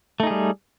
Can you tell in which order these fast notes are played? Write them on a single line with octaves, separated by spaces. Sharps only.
A3 D#4 G#4 G3